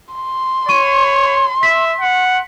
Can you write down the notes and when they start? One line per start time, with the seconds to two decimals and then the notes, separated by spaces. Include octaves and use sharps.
0.14 C6
0.69 C#5 C#6 D#7
1.63 E5 B6
2.01 F#5